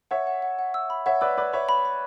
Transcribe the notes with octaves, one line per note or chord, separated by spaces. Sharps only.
C#5 E5 F#5
F#5
F#5
F#5
E6
B5
C#5 E5 F#5
B4 D5 E6
B4 D5 B5
C#5 E5 B5
B5
B5